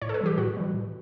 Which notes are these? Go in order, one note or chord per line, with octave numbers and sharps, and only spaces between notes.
A2 C#5
A4
B4
E3 G3 G4
A2 F#4
E3 G3
A2